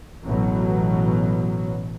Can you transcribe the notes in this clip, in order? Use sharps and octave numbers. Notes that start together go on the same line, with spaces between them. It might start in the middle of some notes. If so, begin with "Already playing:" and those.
A1 B2 F#3